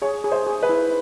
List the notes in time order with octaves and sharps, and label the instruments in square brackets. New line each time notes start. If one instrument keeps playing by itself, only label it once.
[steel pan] G#4 [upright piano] C#5
[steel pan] G#4
[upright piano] C5
[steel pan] G#4
[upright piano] B4
[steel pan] E4